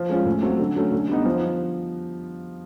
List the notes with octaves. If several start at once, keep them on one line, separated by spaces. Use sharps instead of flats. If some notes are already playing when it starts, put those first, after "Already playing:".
Already playing: F3
G#3 C#4 F4
A2
F#3 A3 C4
D3
F#3 A3 C#4
D3
G3 B3 D#4
F3